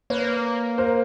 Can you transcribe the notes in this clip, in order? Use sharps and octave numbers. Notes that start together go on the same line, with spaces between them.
A#3 B4 C#5
A#4 C5